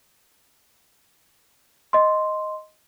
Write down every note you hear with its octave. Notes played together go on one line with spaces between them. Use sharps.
D#5 C6